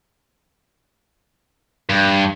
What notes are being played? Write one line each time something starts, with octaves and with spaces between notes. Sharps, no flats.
G2